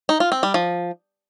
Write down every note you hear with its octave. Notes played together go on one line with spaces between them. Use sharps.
D#4
F4
C4
G3
F3